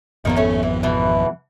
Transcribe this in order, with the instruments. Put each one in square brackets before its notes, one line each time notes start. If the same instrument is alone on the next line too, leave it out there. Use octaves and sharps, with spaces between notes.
[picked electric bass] G#1 F2 B3 [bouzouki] D#3 A#3 D#4
[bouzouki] A3 C#4
E3
B2 E3